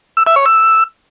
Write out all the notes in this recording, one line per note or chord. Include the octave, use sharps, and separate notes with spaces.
E6
E5
C#5
E6